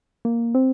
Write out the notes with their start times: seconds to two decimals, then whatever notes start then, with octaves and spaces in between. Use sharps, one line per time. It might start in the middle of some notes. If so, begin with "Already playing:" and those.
0.25 A#3
0.55 C4